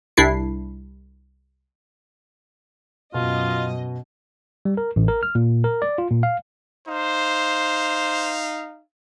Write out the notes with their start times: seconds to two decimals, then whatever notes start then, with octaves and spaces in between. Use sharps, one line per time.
0.17 C2 D4 E4 C7
3.14 F#2 B2 F4 D#5
4.65 G3
4.77 A#4
4.96 A1
5.08 A#4
5.23 F6
5.35 A#2
5.64 A#4
5.82 D5
5.98 F4
6.10 A#2
6.23 F5
6.88 D#4 C5 F5